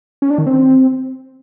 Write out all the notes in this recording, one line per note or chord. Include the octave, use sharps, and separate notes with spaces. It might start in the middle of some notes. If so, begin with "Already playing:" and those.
C#4
D4
D#3
C4